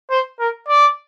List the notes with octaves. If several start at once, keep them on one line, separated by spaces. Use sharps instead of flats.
C5
A#4
D5